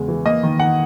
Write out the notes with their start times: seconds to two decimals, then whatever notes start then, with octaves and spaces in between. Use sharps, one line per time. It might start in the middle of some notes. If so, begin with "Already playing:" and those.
Already playing: E2 C#3 G#3
0.08 E3
0.25 A#3 D#5
0.43 D#3
0.60 D#3 F#5